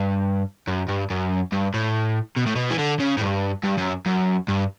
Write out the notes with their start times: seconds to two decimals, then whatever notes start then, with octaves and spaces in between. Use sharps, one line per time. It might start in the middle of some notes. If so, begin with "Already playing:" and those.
Already playing: G2
0.68 F#2
0.89 G2
1.10 F#2
1.52 G2
1.74 A2
2.36 B2
2.46 A2
2.56 B2
2.71 E3
2.79 D3
3.00 C#3
3.18 A2
3.21 G2
3.63 G2
3.77 F#2
4.06 F#2
4.48 G2